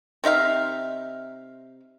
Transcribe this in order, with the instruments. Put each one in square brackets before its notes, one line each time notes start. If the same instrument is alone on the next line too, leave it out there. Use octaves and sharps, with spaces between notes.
[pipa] C3 D#4 E5 F5